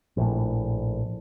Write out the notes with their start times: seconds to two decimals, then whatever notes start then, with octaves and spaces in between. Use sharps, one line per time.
0.17 A#1 A2